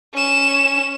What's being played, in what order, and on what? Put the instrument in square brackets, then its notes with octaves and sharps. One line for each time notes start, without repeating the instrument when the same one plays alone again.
[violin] C#4 E7